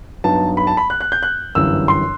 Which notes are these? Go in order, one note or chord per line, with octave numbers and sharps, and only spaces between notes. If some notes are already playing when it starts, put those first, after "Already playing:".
G2 F#3 B3 D#4 A5
B5
A5
B5
F#6
F#6
G6
F#6
G1 F#2 E3 G3 E6
C6